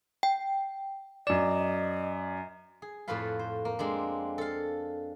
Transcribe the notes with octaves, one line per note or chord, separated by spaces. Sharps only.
G5
F#2 D5 D#5 E7
G#4
F2 A2 F4 A4 B4 F5
C5
A#3
G#3 C4 D4
A4 F5